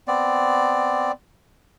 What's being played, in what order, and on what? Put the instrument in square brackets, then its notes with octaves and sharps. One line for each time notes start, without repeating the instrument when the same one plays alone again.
[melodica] B3 C4 D5